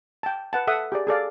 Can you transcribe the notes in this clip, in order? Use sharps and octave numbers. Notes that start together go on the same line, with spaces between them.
G5 A5
B4 F#5 A5
A4 E5 F#5 D#6
G4 G#4 D5
G#4 A4 D5 F5